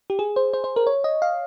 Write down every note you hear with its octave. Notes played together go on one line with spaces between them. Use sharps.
G4
G#4
C5
C5
C5
A#4
C#5
D#5
F5